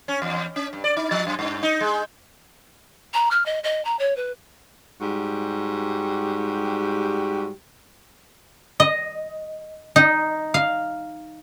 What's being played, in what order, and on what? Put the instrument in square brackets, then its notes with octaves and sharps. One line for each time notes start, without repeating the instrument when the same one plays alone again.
[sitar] C#4
E2
C#4
G2
D5
D#4
F3
F#2
G2
D#4
G#3
[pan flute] A#5
F6
D#5
D#5
A#5
C#5
B4
[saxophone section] G#2 G3 F#4 G4
[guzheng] D#5
D#4
F5